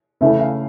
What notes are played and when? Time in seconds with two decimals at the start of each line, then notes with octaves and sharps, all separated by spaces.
0.21 C#3 E3 A3 E5
0.40 F5